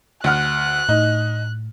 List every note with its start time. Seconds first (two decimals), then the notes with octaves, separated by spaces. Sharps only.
0.24 D2 F#5 F6 F#6
0.89 A2 D#4